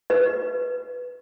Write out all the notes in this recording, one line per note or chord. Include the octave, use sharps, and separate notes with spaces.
B4 D#5